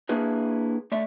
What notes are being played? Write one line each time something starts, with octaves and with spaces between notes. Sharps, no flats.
A#3 D4 E4 G#4 B4
A3 D5 E5